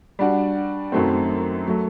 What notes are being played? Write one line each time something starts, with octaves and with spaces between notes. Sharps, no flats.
G3 D4 F#4
F#2 D#3 F#3 A3 C4
F#3 A3